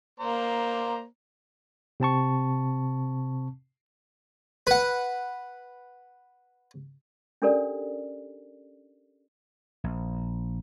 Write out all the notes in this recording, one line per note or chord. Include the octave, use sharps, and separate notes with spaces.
A#3 C5 D5 A#5
C3 C4 A5 C#6
B4 F#5
C#4 D4 G4 A4 A#4 D5
A#1